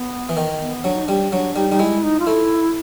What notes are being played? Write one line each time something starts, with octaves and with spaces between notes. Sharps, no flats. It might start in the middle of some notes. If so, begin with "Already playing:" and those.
Already playing: B3
E3
D#3
B3
F#3 D4
D#4
G3 D4
F#3 D4
G3 D#4
G3 D#4
G#3 E4
D#4
F4
A3 E4